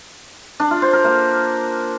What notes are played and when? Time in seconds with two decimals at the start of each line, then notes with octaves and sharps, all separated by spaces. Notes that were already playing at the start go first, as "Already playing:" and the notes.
0.60 D4
0.71 F4
0.82 C5
0.93 A#4
1.04 A#3